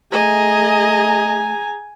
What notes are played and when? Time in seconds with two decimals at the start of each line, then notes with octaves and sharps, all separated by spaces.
0.12 A3 G#4 D#5 G#5 A#5